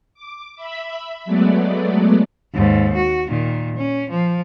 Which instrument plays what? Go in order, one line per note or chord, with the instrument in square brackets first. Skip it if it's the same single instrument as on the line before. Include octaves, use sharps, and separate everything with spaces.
[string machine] D6
E5 B5
F#3 G#3 A3 B3 D5
[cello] D#2 G#2
F#4
A#2 D#3
C#4
F3